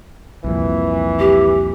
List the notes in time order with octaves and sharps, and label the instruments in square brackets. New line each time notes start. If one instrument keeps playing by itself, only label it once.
[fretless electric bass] C2 F2 A#2 [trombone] E3
[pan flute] G4